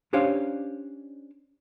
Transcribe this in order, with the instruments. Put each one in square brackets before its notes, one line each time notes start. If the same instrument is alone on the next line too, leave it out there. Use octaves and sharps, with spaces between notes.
[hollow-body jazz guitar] C#4 D4 G4 C5 C#5 F5